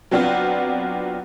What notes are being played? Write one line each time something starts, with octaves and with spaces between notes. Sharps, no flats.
F#3 B3 C4 D4 F4